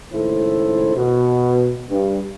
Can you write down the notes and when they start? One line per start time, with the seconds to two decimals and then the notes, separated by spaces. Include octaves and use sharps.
0.12 C#2 A2 D#3 E4 A4 C5
0.96 B2
1.90 G2